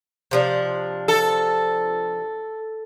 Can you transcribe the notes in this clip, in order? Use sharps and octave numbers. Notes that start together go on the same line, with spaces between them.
C3 F3 D4
A4